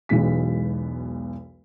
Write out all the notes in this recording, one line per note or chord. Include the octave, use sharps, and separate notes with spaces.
E1 B1 E2 B2 G#3 B6